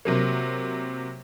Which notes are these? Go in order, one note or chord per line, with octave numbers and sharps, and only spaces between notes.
C3 F#3 A#3